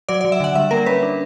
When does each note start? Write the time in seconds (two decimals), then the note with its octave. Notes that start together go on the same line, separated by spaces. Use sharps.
0.09 F#3 D5
0.21 F#3 D5
0.32 E5
0.40 D3 F#5
0.56 G3 E5
0.71 A#3 A#4
0.86 C#4 B4
1.03 D4